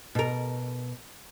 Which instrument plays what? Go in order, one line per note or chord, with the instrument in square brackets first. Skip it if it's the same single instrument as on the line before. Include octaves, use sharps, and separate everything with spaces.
[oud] B2 A#4